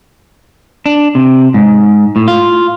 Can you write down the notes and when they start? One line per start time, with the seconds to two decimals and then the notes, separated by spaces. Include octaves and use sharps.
0.86 D4
1.15 C3
1.54 G#2
2.16 A2
2.28 F4